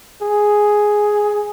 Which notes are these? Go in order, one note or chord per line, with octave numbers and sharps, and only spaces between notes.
G#4